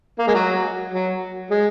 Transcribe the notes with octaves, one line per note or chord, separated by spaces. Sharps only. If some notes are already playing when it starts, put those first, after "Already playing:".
A#3
G#3
F#3
F#3
G#3